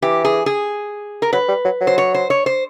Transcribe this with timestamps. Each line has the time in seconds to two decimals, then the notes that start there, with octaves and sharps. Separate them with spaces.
0.02 E3 G4
0.25 G#4
0.46 G#4
1.22 A#4
1.33 F#3 B4
1.48 G3
1.65 F#3
1.81 F#3
1.87 C5
1.98 C#5
2.14 C5
2.30 C#5
2.46 C5